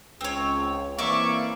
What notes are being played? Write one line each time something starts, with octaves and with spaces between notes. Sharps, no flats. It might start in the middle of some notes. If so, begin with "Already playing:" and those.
C#2 C4 C#5
E3 A#3 C4 C#5 D5 E5 F5 C#6